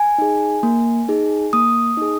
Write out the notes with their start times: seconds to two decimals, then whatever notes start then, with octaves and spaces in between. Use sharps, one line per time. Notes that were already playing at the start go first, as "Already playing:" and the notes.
Already playing: G#5
0.18 D#4 G#4
0.63 A#3
1.08 D#4 G#4
1.53 A#3 D#6
1.97 D#4 G#4